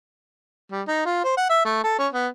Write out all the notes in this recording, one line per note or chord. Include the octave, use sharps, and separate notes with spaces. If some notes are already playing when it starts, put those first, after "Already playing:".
G3
D#4
F4
C5
F#5
E5
A3
A4
C#4
B3